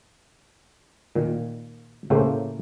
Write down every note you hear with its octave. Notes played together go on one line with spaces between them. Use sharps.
A#2 D#3
A2 C#3 A3 A#3 G4 C5